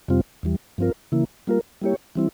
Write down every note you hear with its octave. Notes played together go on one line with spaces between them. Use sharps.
F2 C3 G3 C4 F4
E2 E3 G3
G2 F3 C4 F4 A#4
C#3 E3 A#3 E4
G3 A#3 F4 A#4
G3 A#3 E4 G4 C#5
E3 G3 C4 E4